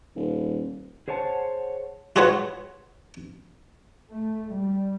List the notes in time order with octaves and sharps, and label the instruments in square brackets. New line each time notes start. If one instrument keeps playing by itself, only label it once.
[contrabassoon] D#1
[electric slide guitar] G#4 C5 C#5 F#5 A5
[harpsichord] F4 F#4 G#4 B4 C#5 F#5
[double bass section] A3
G3